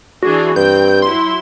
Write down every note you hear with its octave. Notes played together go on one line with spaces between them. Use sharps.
E3 D4 F#4 G#4
G2 C4 G5 G6
F#3 E4 C6